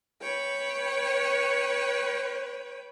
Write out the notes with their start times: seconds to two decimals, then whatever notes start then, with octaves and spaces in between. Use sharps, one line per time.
0.21 B4 C#5 G5